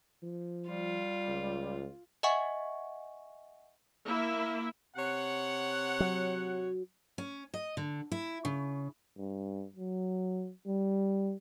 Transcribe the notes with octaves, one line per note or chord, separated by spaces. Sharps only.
F3
G3 F4
C#2
D#5 E5 F#5 G#5 C#6
A#3 E4 E5
C3 C#5 F#5
F#3
C#4
D#5
D3
E4
C#3
G2
F#3
G3